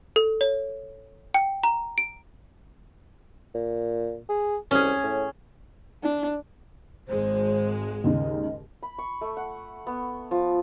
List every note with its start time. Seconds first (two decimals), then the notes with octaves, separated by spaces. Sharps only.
0.16 A4
0.41 C#5
1.34 G5
1.63 A#5
1.98 D7
3.54 A#2
4.29 G#4
4.71 C2 C#4 G#4
5.04 A2
6.03 D4
7.08 G#1 G#3 C5
8.04 D#2 G#2 C#3 D#5
8.83 B5
8.98 C#6
9.21 A3
9.37 F#5
9.87 B3
10.31 F3